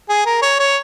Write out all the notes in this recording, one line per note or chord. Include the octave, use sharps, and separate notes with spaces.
G#4
A#4
C#5
C#5